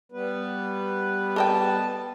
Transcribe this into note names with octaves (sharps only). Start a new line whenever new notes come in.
G3 B3 B4
A4 D#5 G5 A5